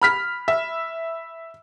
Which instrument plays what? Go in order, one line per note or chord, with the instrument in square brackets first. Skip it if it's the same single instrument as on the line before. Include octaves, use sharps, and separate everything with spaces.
[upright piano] B5 F6 B6
[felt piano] E5